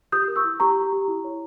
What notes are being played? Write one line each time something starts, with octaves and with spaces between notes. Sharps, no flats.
G4 D#6 G6
A#4
C#6 E6
E4
G4 A#5 C#6
G4
G4
E4
C#5